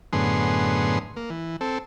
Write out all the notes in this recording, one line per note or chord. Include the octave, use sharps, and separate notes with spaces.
F#2 A2 D3 B3 G#4 C6
A#3
E3
C4 A4